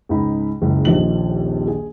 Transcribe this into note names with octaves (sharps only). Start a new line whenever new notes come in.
C#2 G#2 G#3 D#4 B5
F#1 C#2
D#1 A#1 D#2 F3 D#5 F#7
G#4